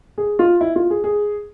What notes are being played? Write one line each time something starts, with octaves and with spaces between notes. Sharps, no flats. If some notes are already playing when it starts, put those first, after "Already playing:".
G#4
F4
E4
F4
G#4
G#4